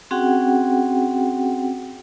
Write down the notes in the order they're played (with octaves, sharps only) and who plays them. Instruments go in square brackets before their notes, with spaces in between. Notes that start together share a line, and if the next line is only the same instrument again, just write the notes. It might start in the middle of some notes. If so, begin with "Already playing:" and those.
[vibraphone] C4 C#4 F#4 G#4 F#5 G5